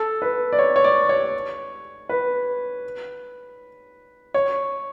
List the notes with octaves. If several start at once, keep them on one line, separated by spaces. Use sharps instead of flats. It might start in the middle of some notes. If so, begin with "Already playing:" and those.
Already playing: A4
B4
D5
C#5
C#5
D5
C#5
B4
C#5